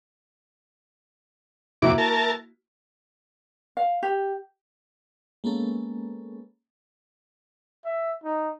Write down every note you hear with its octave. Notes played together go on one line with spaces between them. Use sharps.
F2 C3 A#3 E4 F#4 D6
A#4 A5
F5
G4
G#3 A#3 B3 C#4 A4
E5
D#4